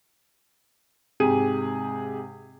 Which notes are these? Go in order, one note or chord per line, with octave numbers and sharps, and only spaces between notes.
G#2 C3 G4 G#4 D#7